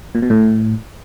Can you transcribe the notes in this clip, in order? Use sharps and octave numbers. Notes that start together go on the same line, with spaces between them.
A#2
B2
A2